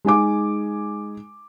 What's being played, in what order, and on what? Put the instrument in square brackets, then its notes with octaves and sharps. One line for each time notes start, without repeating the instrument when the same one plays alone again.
[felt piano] G#3 D#4 G#5 D6